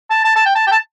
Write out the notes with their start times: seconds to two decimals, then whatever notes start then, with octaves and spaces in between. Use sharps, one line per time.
0.10 A5
0.24 A5
0.36 A5
0.45 G5
0.55 A5
0.67 G5
0.72 A5